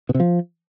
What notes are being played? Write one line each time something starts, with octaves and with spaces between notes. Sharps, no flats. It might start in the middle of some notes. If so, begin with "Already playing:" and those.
B2
C3
F3